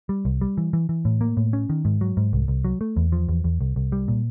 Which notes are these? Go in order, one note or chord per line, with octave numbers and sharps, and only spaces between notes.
G3
C2
G3
E3
E3
E3
A2
A#3
A2
C#4
D#3
G#2
F#3
G#2
C2
C2
F#3
A3
E2
F3
E2
E2
C2
C2
G3
A#2